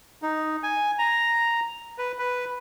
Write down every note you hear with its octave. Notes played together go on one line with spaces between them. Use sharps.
D#4
G#5
A#5
B4
B4